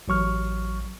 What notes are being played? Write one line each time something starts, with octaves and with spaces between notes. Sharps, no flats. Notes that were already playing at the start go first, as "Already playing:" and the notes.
A1 F#3 C#6 F6